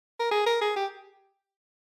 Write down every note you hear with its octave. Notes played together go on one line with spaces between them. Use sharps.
A#4
G#4
A#4
G#4
G4